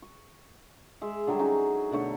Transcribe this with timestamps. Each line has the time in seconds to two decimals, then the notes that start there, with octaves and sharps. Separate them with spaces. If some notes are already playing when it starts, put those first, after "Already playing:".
0.02 C#6
1.02 G#3 E5
1.27 D3 F#3 G3 G#4
1.39 C#4 D#4 F#4
1.91 B2 D3 A3 C#5